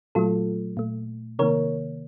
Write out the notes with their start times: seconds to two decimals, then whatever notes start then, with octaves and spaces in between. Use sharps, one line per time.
0.15 A#2 F#3 A3 F4 A4
0.77 A#2 A3
1.39 C3 D#3 A#3 A#4 C#5